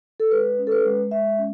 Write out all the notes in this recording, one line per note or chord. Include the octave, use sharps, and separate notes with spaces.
A4
G#3 B4
C#4
A4
B4
G#3
G#3 E5
C#4